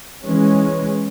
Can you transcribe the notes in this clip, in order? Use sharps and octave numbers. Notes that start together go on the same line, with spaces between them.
E3 G#3 C#4